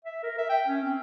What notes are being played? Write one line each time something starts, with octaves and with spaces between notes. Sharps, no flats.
E5
A#4
E5
G5
C#4
C4